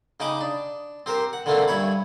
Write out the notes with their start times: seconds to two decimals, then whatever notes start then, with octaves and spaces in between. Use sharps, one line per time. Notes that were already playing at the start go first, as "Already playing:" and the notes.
0.20 C#3 D#4 D#5 G5 B5 D6
0.41 D4
1.06 C4 G4 A#4 C5
1.33 F#5
1.46 D3 E3 A3 A#3 C4 D4
1.68 G2 E4 C#5 B5